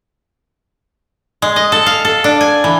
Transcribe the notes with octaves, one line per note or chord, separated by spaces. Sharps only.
G#3
D#5
A4
F5
A4
D4
G#5
E3